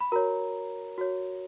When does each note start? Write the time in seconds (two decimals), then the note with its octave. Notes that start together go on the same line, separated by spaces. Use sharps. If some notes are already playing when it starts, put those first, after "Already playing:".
0.01 B5
0.12 F#4 A#4 C#5 A#5
0.98 F#4 C#5